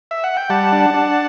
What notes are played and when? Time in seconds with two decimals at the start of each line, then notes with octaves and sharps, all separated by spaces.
0.11 E5
0.24 F#5
0.37 G5
0.50 G3 F#5 A5
0.72 D4
0.94 D4